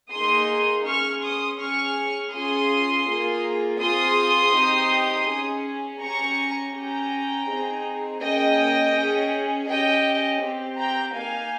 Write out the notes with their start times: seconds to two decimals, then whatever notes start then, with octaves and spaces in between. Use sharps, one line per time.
0.12 A#3 D#4 G#4 C6 D#6
0.86 C#4 G#4 C#6 F6
1.23 C6 D#6
1.60 C#4 G#4 C#6 F6
2.33 C#4 F4 G#4 C6 D#6
3.07 A#3 F4 G#4
3.80 C4 F4 G#4 C6 D#6
4.54 C4 D#4 G4
5.28 C#4 G#4
6.01 C#4 G4 A#5 C#6
6.74 C#4 G4 G5 A#5
7.48 C4 D#4 G#4
8.21 A#3 C#4 G#4 D#5 G5
8.95 C#4 G#4
9.68 C#4 G4 D#5 G5
10.42 C4 G4
10.78 G5 A#5
11.15 A#3 D#4 G4 F5 G#5